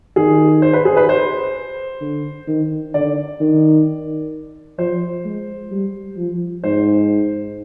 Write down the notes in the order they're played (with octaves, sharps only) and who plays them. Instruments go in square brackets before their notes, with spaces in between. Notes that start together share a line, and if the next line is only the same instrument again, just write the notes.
[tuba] D#3 [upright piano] G#4
[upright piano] C5
B4
G#4
B4
C5
[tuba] D3
D#3
[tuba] D3 [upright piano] D5
[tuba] D#3
[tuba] F3 [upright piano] C5
[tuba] G#3
G3
F3
[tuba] G#2 [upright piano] C5